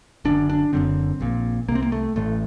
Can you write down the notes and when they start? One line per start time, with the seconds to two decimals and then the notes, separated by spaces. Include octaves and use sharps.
0.25 F#1 F#2 D3 D4
0.50 D4
0.73 F#1 F#2 D3 C4
1.21 A#1 A#2
1.68 C2 A#3
1.72 C3 C4
1.82 A#3
1.92 A3
2.16 A1 A2 A3